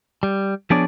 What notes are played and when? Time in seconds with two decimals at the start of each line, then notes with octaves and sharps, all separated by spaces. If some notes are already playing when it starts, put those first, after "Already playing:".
0.23 G3
0.70 F3 B3 D4 G#4 C#5 D5